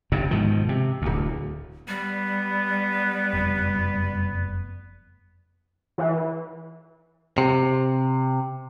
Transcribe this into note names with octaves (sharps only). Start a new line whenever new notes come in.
G1 G2 C3
G#2 B2 D#3 F3
C3
D1 D2
G3 B3
F#1 F2
E3
C3